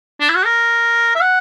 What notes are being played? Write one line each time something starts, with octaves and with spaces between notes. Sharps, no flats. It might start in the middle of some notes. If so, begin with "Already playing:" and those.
D4
E4
F#4
A#4
E5
F#5